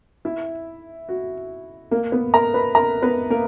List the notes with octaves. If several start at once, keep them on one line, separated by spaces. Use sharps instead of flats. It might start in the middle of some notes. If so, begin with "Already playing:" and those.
E4 E5
F#4
A#3 A#4
B3 B4
A#4 A#5
B4 B5
A#4 A#5
B3 B4
A#3 A#4